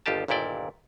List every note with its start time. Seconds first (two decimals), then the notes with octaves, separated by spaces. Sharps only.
0.06 G1 D#2 F4 G4 A5
0.28 G1 D#2 A#2 E4 D5 G5